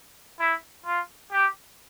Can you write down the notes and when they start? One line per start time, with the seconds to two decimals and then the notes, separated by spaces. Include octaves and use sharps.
0.40 E4
0.86 F4
1.32 G4